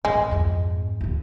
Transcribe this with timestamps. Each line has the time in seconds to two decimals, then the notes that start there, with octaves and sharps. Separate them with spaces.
0.05 A1 G#3
0.31 F2 G#2
1.01 D#2 A#2